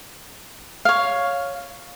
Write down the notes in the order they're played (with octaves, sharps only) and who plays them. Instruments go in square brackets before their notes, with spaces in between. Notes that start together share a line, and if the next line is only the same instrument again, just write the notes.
[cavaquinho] C#5 F5